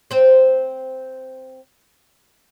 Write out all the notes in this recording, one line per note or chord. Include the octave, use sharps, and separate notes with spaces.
C4 C5